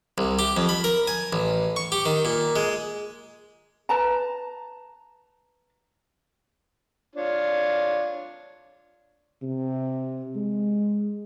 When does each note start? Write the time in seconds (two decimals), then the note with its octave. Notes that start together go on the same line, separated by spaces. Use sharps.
0.18 C2
0.39 G4
0.57 F2
0.69 B5
0.84 A#4
1.08 G#5
1.33 A1
1.76 C#6
1.92 G4
2.06 D#3
2.25 A#2
2.56 G#3
3.89 B4 A5 A#5
7.15 D4 F4 C#5
9.42 C3
10.36 G#3